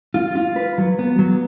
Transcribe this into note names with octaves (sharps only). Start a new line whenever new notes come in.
F4
F4
B4
F#3
B3
F#3